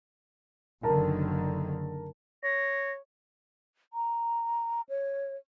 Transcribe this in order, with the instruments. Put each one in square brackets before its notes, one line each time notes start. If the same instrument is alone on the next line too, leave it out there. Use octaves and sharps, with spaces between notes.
[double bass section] F#1 D3 D#3 [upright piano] A#4 A5
[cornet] C#5 [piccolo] A#6
[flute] A#5
C#5